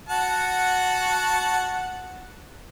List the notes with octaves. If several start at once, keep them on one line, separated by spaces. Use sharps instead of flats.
F#4 F#5 A5